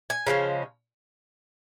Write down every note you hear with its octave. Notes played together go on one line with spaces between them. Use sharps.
G#5
C#3 F3 G#3 C#4